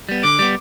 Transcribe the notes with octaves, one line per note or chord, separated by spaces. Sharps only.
G3 B3
D3 D6
G3 B3